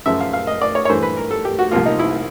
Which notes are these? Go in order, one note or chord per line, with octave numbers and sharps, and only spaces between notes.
F#2 C#3 F3 E5
F5
F5
D#5
D5
C#5
C#5
G2 E3 A3 C5
B4
A#4
A4
G4
F#4
C2 C3 F3 A#3 F4
D#4
E4